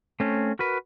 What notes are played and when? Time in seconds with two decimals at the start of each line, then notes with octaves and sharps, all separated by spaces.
0.20 A3 C4 C#4
0.59 F#4 A#4 B4